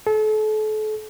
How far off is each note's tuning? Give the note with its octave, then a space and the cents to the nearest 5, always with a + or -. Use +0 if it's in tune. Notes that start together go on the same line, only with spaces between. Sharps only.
A4 -35